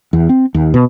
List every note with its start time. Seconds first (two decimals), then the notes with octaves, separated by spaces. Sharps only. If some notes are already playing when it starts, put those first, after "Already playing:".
0.13 E2
0.29 C4
0.54 D#2
0.74 B2